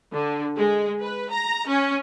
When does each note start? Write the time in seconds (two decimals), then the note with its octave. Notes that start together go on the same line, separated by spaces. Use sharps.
0.14 D3
0.56 G#3
1.01 B4
1.32 A#5
1.68 C#4